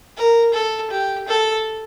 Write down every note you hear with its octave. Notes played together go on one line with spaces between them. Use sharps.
A#4
A4
G4
A4